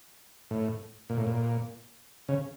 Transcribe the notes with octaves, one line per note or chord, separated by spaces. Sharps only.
A2
A#2
A2
A#2
C#3